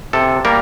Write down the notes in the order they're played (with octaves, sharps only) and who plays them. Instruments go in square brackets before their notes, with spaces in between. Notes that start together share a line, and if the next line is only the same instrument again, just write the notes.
[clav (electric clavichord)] C3 A4
G3 A#3 A#4